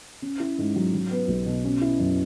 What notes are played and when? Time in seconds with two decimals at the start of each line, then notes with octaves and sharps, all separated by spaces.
0.22 C#4
0.40 E4
0.58 G#2
0.76 F#3
0.94 F#3
1.11 B3
1.28 B1
1.46 B2
1.65 C#4
1.81 E4
2.00 F#2